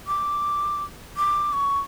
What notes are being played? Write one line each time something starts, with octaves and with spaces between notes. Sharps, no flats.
D6
D6
C#6